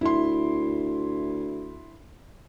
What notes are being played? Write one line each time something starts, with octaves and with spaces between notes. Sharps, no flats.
D2 E4 C6